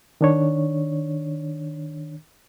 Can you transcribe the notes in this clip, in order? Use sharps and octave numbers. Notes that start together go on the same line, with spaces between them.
D#3 D4 C#5